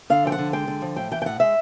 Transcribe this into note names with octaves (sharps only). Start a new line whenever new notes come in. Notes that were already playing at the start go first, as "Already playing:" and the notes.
D3 F5
F3 G5
F#5
D3
G#3 G5
D3
F3
A2 G5
E3 G5
G5
A2 F#5
G#3 E5